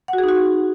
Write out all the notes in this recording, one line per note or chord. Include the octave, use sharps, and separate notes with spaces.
F#5
F#4
G#4
D#4
F#4